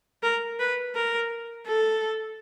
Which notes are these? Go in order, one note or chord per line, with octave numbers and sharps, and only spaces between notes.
A#4
B4
A#4
A4